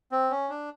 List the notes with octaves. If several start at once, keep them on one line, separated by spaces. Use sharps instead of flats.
C4
C#4
D4